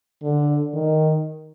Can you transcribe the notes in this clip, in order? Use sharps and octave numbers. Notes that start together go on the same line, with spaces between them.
D3
D#3